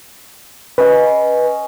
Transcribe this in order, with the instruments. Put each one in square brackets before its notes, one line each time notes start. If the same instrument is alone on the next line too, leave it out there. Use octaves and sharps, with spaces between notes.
[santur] C#4 D#5 G#5 [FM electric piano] B4